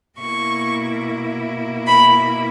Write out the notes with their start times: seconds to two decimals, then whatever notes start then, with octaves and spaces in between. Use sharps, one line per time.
0.18 B2 A#3 E4 C#6
1.87 B5